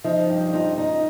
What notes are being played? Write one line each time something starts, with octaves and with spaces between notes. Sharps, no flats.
F3 D#4
G2
D#4 F4
D#4